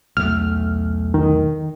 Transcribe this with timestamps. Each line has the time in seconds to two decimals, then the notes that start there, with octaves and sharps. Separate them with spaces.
0.17 B1 E2 A3 F6
1.14 D#3